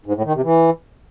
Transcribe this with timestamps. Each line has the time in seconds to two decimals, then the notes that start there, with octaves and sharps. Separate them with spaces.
0.06 G#2
0.15 A2
0.25 D#3
0.34 C3
0.44 E3